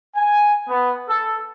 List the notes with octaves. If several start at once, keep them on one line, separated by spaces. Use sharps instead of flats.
G#5
B3
A4